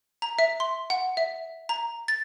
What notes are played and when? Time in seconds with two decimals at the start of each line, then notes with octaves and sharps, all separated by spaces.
0.22 A#5
0.39 E5
0.60 C6
0.90 F#5
1.17 E5
1.69 A#5
2.08 A6